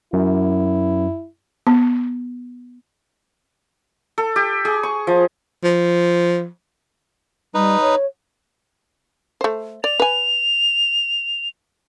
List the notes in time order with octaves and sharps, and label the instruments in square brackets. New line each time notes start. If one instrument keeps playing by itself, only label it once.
[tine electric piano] F#2 [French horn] E4
[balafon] B3
[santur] A4
G4
G#4
C#6
F3
[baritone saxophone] F3
[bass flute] G3 [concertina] D#4 B4
[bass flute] C#5
[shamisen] A3 C5
[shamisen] D5 [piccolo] F7
[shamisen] B4 G#5